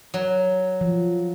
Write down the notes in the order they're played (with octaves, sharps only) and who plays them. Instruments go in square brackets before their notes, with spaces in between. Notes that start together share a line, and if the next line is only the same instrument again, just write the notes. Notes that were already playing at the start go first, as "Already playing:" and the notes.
[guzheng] F#3
[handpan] F3